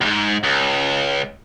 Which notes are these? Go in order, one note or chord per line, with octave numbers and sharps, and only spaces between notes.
D2 G#2
C#2